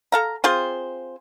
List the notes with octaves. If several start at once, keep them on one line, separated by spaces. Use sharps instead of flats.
A4 F5 A#5
C4 F4 G#4 C5